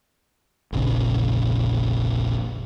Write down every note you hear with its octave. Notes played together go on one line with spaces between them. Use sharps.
F1 A#1 C#3